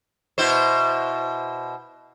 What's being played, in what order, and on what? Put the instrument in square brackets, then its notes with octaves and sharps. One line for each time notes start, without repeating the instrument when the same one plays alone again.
[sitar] B2 E4 C5